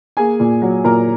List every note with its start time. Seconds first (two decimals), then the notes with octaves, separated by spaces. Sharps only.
0.17 A#3 G#4 G#5
0.40 A#2
0.62 F#3
0.84 A#2 A#4 A#5